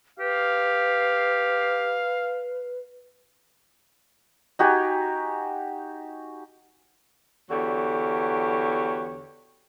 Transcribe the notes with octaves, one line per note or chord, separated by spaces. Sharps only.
G4 B4 F5
D#4 F#4 G4 G#5
E2 D3 F#4 G4 C#5